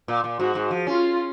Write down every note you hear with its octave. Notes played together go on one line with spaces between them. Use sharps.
A#2
A#2
G#2 F#4
G#2
F3
C#4 F4